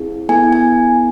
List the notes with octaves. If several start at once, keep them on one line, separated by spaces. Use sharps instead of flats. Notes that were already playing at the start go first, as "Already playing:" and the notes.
Already playing: C4 E4 G#4
B3 E4 A4 G#5
G#5